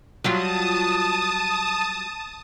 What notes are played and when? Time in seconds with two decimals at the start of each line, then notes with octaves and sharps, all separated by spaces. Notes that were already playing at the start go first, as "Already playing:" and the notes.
0.24 F#3 G3 F4 A5 D#6